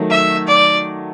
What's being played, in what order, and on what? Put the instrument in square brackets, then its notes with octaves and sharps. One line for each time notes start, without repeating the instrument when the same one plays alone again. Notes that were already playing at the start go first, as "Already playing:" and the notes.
Already playing: [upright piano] D#3 F#3 A3
[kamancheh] E5
D5